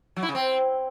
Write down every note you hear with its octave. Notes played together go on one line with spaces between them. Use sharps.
F#3
E4
C#3
C4